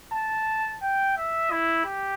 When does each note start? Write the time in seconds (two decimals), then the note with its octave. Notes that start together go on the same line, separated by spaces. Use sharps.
0.13 A5
0.82 G5
1.17 E5
1.51 E4
1.86 G4